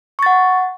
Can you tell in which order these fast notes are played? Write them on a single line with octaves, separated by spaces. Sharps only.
C#6 A6 F#5